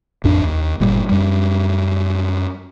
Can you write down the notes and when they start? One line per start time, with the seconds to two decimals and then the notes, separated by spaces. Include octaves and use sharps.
0.24 A1 F2 D4
0.45 D#2
0.80 G1 A#2 G3
1.09 F#2 G3